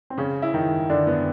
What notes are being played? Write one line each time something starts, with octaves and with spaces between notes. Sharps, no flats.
C4
C#3 C#4
E4
D#3 D#4
D3 D4
B3